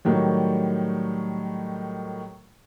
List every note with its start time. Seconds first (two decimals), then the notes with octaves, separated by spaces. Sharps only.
0.05 A2 D#3 F#3 G3